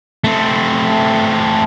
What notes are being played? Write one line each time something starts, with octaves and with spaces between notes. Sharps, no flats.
A3 C4